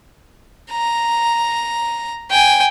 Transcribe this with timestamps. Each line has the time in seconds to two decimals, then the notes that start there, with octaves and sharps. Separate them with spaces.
0.71 A#5
2.31 G5 G#5